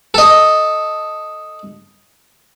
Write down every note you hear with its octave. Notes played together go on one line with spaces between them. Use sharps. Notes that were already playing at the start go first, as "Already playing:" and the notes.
A4 D#5